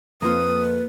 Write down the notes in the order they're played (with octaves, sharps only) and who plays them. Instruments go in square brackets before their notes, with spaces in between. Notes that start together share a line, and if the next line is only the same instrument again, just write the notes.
[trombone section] F2 [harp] A#3 F4 [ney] B4 [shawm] D#6